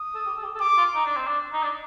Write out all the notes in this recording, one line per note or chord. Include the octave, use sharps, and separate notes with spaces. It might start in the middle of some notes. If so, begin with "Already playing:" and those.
Already playing: D#6
A4
G4
A4
G4
A4
G4 D6
F4
D#4
D4
C4
D4
D#4
D4